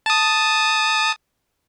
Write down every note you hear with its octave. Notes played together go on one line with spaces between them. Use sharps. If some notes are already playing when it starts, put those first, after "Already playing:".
A5 D#6